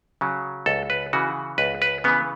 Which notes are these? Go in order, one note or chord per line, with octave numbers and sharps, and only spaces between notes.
C#3 F#3
C#2 A4
B4
C#3 E3 F#4
C#2 B4
B4
C#3 E3 B3